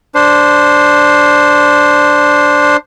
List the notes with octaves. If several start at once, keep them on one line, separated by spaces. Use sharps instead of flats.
D4 C5